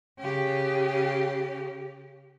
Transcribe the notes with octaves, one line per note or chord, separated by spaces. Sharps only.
C#3 G4